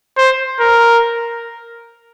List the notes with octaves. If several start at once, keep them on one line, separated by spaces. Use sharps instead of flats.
C5
A#4